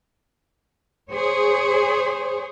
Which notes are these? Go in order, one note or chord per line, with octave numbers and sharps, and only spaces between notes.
G#4 C5 C#5